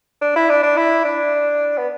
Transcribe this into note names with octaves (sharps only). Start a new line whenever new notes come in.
D4
E4
D4
D4
E4
D4
B3